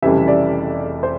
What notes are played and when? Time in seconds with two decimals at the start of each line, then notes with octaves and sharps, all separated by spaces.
0.02 F1 F2 C#3 E3 G3 E5
0.28 D5
1.03 C5